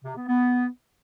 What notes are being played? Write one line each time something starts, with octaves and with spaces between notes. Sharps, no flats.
C3
B3
B3